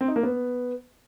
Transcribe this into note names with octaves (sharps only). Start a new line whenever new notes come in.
C4
D#4
A#3
B3